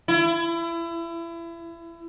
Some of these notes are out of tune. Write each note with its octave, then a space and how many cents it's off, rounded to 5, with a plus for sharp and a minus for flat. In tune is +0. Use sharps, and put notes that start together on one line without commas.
E4 +30